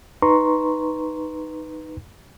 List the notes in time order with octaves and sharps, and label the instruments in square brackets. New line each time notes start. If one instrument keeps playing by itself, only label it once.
[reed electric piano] D#4 B4 A#5 C6 C#6